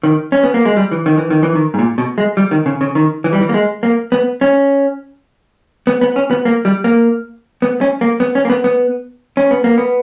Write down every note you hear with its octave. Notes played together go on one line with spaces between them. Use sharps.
D#3
C#4
B3
A#3
G#3
G3
E3
D#3
E3
D#3
E3
D#3
G#2
A#2
B2
G#3
G3
D#3
C#3
C#3
D#3
E3
G3
E3
A#3
G#3
A#3
B3
C#4
B3
B3
C#4
B3
A#3
G3
A#3
B3
C#4
A#3
B3
C#4
A#3
B3
B3
C#4
B3
A#3
B3